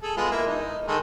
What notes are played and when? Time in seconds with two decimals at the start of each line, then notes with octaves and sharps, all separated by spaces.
0.03 G#4 A4
0.17 G#3 B3 F4
0.31 A#3 E4
0.47 D#4
0.88 D#3 G#3 A4